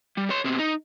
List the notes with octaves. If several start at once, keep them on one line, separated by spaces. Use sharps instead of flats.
G3
C#5 C6
B2 C4
D#4